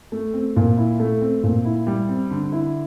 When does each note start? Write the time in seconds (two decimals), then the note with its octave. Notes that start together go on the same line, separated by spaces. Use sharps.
0.12 A3
0.34 C4
0.56 A#2
0.77 E4
1.00 A3
1.22 C4
1.43 A#2
1.65 E4
1.87 G3
2.09 C4
2.31 D3
2.52 E4